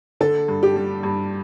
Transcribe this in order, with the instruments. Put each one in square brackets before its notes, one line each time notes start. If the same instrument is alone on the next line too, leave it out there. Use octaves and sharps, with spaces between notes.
[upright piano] D3 [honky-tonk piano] A4
[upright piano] G2
[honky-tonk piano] G4
[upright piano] G3
G2